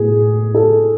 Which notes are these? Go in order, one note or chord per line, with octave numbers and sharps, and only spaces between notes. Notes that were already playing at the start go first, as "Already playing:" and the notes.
Already playing: A2 B3 G#4
A4